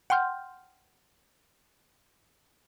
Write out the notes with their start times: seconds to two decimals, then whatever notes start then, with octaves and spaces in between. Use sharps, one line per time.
0.10 F#5 G5 C6 F6 G6